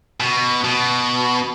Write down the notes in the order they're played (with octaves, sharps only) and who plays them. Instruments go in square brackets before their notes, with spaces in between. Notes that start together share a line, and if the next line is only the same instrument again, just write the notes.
[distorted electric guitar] B2
B2